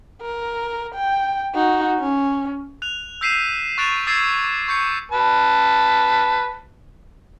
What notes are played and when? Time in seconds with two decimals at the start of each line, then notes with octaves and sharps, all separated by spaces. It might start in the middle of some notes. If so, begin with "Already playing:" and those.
0.21 A#4
0.94 G5
1.55 D#4 F#4
1.99 C#4
2.82 F#6 F7
3.21 E6 G6 B6 C7 D#7 E7
3.78 C#6 F#6 A6 D7 E7 F7
4.07 D6 E6 G#6 A6 C7 E7
4.44 D6
4.68 C#6 G6 C7 C#7
5.12 B4 A5